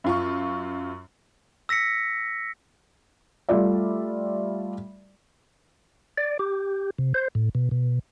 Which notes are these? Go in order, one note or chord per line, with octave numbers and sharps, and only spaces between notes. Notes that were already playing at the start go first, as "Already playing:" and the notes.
F#2 F4 C#6
E6 A#6 B6 C#7
G3 A3 F4 D5 E5
D5
G4
C3
C5
A2
B2
B2